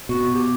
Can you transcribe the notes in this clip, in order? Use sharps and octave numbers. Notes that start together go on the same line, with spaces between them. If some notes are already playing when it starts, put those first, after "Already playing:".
B2 F#4
G4